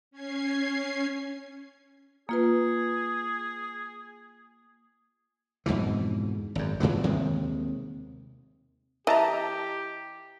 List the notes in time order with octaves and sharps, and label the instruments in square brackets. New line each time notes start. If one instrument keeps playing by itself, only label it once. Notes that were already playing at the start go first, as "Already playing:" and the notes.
[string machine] C#4 G#6 C7
[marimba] A#3 F4 B4 [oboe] G#4
[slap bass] F2 G#2 B2 E3
G#1 F#2
G2 A#2 E3 F#3
D#2 C3 D#3 G#3
[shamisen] E3 [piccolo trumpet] G4 [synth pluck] D#5 A5 A#5